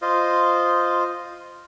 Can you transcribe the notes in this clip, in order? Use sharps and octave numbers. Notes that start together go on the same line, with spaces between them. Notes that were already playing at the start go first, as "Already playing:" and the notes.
F4 C5 D#5